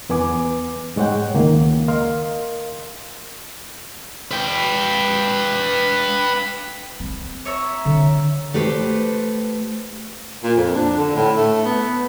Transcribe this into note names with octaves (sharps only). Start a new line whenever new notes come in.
E2 B3 B4 G#5 D6
G#2 G#3 C#5 F#5 G5
C#2 D#3 A#3
A#4 D#5 F5 C6 F6
B4 G5
C4
C#5 E5 A#5
D3
A3 G4 B4 C5
A#2
F2
D4
D3
A2
A3
B3